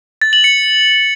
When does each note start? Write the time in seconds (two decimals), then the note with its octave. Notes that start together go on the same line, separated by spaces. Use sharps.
0.22 A6
0.33 F#7
0.44 C#7